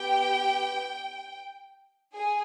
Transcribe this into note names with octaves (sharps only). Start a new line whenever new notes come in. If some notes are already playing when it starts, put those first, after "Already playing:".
Already playing: B3 G4 G5
G#4 G#5